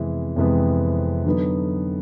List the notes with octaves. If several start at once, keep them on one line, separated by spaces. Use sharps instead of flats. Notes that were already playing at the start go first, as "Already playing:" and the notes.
Already playing: F2 C3 E3 G#3 B3
F2 C3 E3 G#3 B3
D3 F#3 B3 D#4